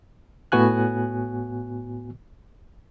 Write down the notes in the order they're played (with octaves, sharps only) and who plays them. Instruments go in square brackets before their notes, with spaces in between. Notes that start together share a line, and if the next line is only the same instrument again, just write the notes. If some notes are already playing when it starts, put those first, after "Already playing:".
[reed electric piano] A2 B3 F#4 G#5 F#6